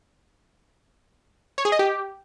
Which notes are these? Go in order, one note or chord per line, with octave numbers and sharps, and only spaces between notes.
C#5
G#4
D#5
G4